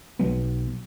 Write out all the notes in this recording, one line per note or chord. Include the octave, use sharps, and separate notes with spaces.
B1 F#3 B3